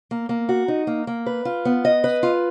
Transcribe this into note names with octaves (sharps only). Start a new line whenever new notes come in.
A#3
A#3
F#4
D#4
A#3
A#3
B4
F4
B3
D#5
B4
F4